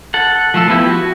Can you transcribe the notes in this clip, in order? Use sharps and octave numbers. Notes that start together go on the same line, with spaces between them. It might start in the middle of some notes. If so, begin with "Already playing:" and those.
A4 F#5
F3 A3 A4
F3 B3 E4 G4
F#4